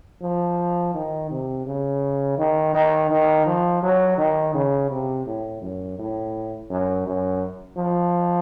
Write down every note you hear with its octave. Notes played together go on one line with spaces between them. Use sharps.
F3
D#3
C3
C#3
D#3
D#3
D#3
F3
F#3
D#3
C#3
C3
A2
F#2
A2
F#2
F#2
F3